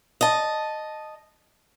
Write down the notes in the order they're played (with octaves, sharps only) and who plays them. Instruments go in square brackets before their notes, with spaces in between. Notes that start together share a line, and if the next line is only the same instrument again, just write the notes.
[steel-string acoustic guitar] D#5 A5